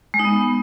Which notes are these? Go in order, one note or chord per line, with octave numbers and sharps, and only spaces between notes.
G#3
D#4
B3